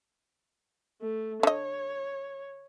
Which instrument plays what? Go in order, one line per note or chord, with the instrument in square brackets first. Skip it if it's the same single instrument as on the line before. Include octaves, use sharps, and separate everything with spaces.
[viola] A3
[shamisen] D3 D#5 [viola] C#5